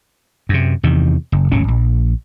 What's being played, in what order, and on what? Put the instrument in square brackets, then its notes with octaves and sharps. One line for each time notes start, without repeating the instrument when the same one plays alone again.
[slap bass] F#2 C3
E2 C3 D#3
F#1
D1 G#1 C#3 C#4
A#1